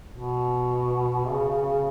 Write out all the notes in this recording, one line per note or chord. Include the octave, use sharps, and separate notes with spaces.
B2
C#3